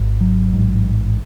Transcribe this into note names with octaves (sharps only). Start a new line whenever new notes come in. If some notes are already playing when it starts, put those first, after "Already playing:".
Already playing: G#1 G#2
F#3
A1 G#2